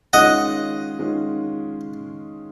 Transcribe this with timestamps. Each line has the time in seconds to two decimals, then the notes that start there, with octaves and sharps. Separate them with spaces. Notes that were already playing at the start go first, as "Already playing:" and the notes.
0.13 D#3 G#3 C#4 F4 G#4 D#5 F#5
0.99 D#3 G#3 C#4 F4 G#4